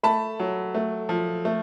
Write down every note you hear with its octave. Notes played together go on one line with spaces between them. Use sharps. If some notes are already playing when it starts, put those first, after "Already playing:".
A3 A5 B5
F#3
A3
F3
A3